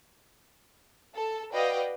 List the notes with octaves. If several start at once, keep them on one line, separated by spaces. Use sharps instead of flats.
A4
F#4 B4 D5 D#5 F5 G5